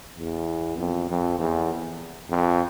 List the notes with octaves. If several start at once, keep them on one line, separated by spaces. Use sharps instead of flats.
E2
F2
F2
E2
F2